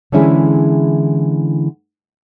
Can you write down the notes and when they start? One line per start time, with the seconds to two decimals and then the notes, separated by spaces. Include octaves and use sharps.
0.12 D3 E3 G#3 C#4 E4 G#4